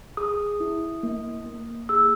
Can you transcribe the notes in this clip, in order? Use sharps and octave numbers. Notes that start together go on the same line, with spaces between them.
G#4 D#6
E4
A#3
A#3
G#4 E6